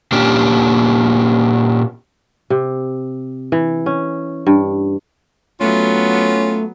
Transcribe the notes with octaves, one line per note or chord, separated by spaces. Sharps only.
A#2 A#3 C#4 D4 G4
C3
E3
C#4
G2
F#3 A3 B3 C#4 F4